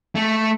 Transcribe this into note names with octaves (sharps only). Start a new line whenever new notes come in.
A3